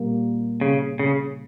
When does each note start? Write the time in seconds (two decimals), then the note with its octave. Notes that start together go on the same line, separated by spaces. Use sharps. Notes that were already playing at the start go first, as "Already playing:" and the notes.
Already playing: A#2 G3 A#3
0.61 C#3
0.99 C#3